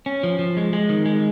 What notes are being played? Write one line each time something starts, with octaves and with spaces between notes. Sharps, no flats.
C#4
F3
F3
G#3
G#3
D#3
G#3